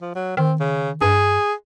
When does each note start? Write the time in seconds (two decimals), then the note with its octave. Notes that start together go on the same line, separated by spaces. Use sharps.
0.01 F3
0.15 F#3
0.37 D#3 C4
0.60 C#3
1.01 G2 G#4